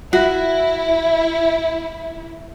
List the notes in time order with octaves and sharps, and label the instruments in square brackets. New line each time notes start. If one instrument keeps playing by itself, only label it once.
[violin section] E4 [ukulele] F#4